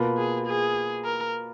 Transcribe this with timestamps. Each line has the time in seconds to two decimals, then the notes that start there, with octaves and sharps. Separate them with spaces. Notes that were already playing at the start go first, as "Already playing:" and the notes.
Already playing: B2 A#3 F4 B4
0.17 G#4
0.47 G#4
1.05 A#4